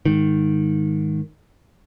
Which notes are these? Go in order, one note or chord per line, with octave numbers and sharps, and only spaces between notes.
G#2 D#3